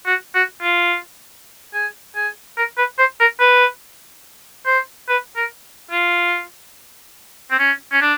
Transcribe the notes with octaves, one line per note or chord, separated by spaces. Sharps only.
F#4
F#4
F4
G#4
G#4
A#4
B4
C5
A#4
B4
C5
B4
A#4
F4
C4
C#4
C#4
D4